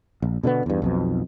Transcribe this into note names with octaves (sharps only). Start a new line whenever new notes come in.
A#1
B2 D3 E3 B3
E2 G2
B1 F2 B2